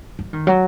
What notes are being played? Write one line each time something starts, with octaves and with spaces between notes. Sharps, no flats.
F#3
D#3
F#3